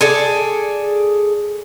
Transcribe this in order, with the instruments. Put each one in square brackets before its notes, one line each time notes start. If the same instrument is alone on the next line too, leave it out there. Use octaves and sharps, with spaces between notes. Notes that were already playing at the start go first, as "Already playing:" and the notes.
[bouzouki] G#4 A4 D5